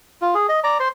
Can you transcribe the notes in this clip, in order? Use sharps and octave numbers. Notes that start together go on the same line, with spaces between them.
F4
G#4
D#5
D5 A#5
C5 C6